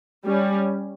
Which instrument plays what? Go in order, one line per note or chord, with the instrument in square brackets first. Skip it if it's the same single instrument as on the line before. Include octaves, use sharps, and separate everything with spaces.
[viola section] G3 C#4